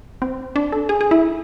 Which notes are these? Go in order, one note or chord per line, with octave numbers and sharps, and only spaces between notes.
C4
D4
A4
G#4
G#4
E4